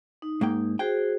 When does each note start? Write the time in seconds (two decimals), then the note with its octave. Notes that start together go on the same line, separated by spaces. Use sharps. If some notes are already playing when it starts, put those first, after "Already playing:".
0.22 D#4
0.41 G#2 A#3 G5
0.79 F#4 G#4 C5 G5